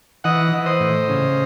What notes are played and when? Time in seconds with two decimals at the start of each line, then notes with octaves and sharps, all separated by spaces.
0.24 E3 D#5 F#5
0.52 E3
0.66 C5 D#5
0.80 A2
1.09 C#3